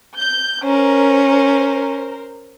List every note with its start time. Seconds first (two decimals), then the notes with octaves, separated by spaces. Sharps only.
0.17 G6
0.65 C#4 A#4 C5